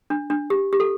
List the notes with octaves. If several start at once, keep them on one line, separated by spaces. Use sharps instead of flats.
D4
D4
G4
G4
A4